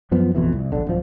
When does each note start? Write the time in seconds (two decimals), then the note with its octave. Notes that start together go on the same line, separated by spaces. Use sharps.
0.11 F#2 F3 B3
0.35 A1 F2 B2 E3
0.53 C2
0.72 A#1 D3
0.87 D1 F3